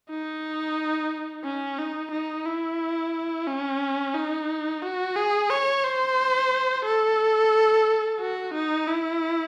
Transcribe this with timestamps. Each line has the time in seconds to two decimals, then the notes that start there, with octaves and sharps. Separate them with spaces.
0.10 D#4
1.44 C#4
1.79 D#4
2.11 D#4
2.46 E4
3.47 C#4
4.14 D#4
4.82 F#4
5.16 G#4
5.50 C#5
5.83 C5
6.85 A4
8.20 F#4
8.54 D#4
8.88 E4